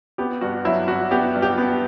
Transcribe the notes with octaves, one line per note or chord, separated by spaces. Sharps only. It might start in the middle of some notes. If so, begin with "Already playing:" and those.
B3 G4
G2 F#4
F#3 E4
G2 F#4
B3 G4
G2
G4
B3